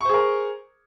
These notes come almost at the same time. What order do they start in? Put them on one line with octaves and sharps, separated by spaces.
C#6 C5 G#4 A#4